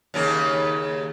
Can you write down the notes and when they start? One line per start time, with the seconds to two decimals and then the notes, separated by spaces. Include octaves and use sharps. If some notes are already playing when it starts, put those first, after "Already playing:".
0.14 D#2 C#3 A#3